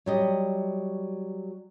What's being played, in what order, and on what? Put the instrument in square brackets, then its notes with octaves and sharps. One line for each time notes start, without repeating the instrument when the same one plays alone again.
[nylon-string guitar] F#3 G3 D#5